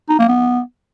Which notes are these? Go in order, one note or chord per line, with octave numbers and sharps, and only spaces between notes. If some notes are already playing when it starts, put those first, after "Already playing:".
D#4
A#3
B3